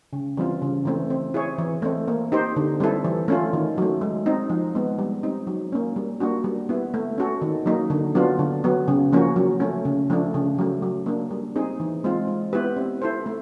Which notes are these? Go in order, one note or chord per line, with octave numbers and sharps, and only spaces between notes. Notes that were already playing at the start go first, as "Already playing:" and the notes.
C#3
E3 G3 C4 F4
C#3
E3 A3 C4
C4
E4 G#4 C#5
E3
A3 C4
A#3
D#4 G4 C5
D3
G3 C4 E4 A4
E3
A3 C#4 F4
D#3
F#3 A3
G#3
C4 D#4
F3
G#3 B3
G3
C4 D#4
F#3
A#3 C#4
G3
A#3 D4 F#4
G3
B3 E4
A3
C#4 F#4 A4
D#3
F#3 A#3 D#4
D3
F#3 B3 D4 F4
D3
F#3 B3
C#3
F3 A#3 C#4 F#4
F#3
A3 C#4
C#3
F3 A3 D4
C#3
F#3 A3
F#3
A#3 D4
G3
C4 D#4 G#4
E3
G#3 C4 F4
G#3
B3 E4 G4 B4
C4
E4 A4 C5
A3